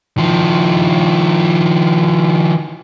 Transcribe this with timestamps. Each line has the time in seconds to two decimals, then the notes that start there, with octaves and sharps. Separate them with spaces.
0.17 D#3 F3